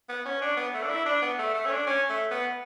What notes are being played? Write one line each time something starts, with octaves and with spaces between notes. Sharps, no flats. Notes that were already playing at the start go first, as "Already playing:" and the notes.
B3
C#4
D4
B3
A3
D4
E4
D4
B3
A3
A3
C#4
D4
C#4
A3
B3